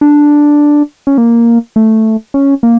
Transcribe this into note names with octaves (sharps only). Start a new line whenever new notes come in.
D4
C#4
A#3
A3
C#4
A#3